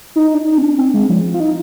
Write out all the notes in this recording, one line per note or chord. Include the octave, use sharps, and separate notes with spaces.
D#4
D4
D#4
C4
D4
C4
G#3
F3
F3
F4
D#4